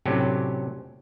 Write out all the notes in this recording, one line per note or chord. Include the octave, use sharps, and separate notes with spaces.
A2 C3 F#3 C#4 D4 G4